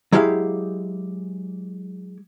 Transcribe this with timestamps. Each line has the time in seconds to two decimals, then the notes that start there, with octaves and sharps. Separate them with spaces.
0.12 F#3 G#3 E4 G4 F5